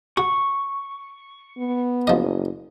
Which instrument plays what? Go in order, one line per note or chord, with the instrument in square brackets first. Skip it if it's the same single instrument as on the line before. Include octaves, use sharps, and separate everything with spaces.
[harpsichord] F#4 [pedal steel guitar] C#6
[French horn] B3
[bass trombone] F#1 [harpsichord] F3 D#5